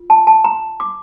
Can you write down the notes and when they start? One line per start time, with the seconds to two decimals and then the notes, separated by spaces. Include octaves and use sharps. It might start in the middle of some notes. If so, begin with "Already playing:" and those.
Already playing: F4
0.10 A5
0.27 A5
0.44 A#5
0.80 D6